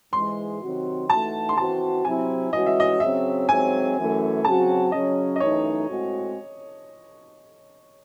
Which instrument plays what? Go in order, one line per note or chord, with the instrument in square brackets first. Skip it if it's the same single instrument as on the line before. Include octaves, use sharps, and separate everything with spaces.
[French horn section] G#2 E3 G#3 [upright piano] C6
[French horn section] C3 D#3 F#3 C4 F#4
[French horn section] E3 A3 D#4 F#4 [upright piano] A5
[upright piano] C6
[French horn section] E3 C4 F#4 [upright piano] A5
[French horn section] C3 F#3 C4 E4 [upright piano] G#5
[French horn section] E3 G#3 C#4 F#4 [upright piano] D#5
[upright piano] E5
D#5
[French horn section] C#3 F#3 C4 [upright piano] E5
[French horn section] G#2 F#3 C4 [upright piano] G#5
[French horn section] F#2 E3 A3
[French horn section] C#3 F#3 C4 F#4 [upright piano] A5
[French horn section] C#3 F#3 C#4 [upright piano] D#5
[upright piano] D#5
[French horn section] F#2 E3 A3 D#4 [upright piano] C#5
[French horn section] A2 G#3 C4 F#4